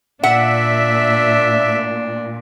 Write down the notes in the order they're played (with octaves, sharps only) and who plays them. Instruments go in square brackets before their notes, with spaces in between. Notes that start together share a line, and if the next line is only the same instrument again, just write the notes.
[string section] A#2 [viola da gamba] D4 [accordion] E5 [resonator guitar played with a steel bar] F#5